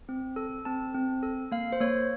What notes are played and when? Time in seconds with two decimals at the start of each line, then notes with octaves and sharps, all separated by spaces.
0.09 C4
0.36 A4
0.65 C4 A5
0.95 C4
1.23 A4
1.52 A#3 F5
1.72 C5
1.80 A#3 C#5